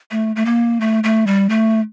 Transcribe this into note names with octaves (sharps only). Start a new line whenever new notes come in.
A3
A3
A#3
A3
A3
G3
A3